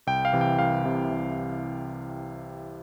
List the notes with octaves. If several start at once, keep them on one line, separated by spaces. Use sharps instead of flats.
C2 G5
F5
C3 E3
G5
C2 F5
C3 E3
C2